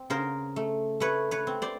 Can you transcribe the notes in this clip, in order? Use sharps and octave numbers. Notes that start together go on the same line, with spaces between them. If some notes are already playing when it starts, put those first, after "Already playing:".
Already playing: C4
C#3 A#4 C5
A3
A3 B4 C#5
B4 C#5
C4
C5 D5